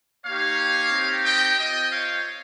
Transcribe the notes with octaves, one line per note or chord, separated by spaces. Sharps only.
A#3 D#4 G4 C#5 F5
C4 D#4 G4
D#5 G5
C4 F4 D#5 G5
C#5 F5